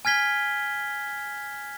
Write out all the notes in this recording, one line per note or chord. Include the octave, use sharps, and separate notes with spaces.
G#5 F6 G#6 B6 G7